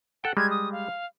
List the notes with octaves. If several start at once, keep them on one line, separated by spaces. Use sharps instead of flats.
A4 F#5 G5
G3 G#3 G#6
D#6
F5